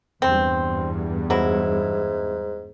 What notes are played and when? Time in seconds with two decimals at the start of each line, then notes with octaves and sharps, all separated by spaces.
0.22 E2 G2 C4
1.30 G#2 F#3 E4